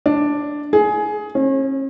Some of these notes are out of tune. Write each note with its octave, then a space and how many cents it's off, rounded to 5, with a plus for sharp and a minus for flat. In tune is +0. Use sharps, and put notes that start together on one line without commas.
D4 +0
G#4 +15
C#4 -40